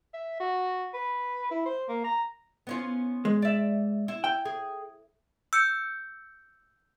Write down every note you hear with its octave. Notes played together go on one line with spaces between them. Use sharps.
E5
F#4
B4
E4
C5
A#3
A#5
B3 C#4 F4
G#3
D5 E5
E4
G5
G#4
E6 G6 C#7